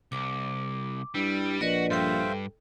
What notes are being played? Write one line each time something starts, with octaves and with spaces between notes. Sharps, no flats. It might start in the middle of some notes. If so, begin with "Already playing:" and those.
C2 D6
G2 G3 E4
A#1 F#4 B4 D5 D#5
G2 A4 C5 E5 F5 G5